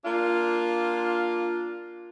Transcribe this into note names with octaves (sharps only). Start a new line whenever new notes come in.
A#3 D4 F4